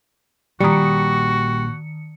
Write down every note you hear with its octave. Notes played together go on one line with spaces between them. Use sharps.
A#1 A#2 D#3 G3 F#4 C#7